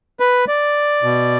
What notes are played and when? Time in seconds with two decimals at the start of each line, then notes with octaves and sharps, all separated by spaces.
0.20 B4
0.48 D5
1.03 B2